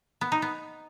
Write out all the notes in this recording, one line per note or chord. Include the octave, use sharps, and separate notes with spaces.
B3
D#4
B3